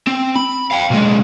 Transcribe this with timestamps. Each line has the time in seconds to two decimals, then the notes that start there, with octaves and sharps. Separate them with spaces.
0.07 C4
0.36 B5
0.72 F5 G5
0.91 B1 G#3